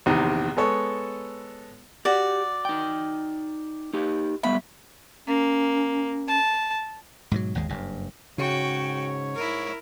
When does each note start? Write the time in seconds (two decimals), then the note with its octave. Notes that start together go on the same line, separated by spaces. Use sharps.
0.06 A#1 E2 C3 D#3
0.57 G#3 B3 A4 C#5
2.05 F#4 G4 D5
2.65 D#4 G5
3.93 D#4 G4
4.43 G3 B3 E5 B5
5.27 A#3 C#4
6.28 A5
7.31 G#2 B2 F3 F#3
7.55 G#1 D#2 G#3
7.69 F#1 G2
8.38 G#2 C#3 F#4 C#5 G5
9.35 E4 A#4